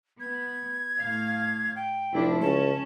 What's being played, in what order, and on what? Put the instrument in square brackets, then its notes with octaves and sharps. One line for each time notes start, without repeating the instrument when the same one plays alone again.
[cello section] B3 [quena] G#6
[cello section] A2 F5
[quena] G5
[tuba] F1 [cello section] F3 D4 E4
[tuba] C#2 [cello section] C#4 [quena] A5